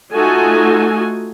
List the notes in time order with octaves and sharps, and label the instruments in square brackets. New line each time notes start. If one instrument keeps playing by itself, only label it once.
[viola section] A3 D#4 F4 F#4 A4 G#5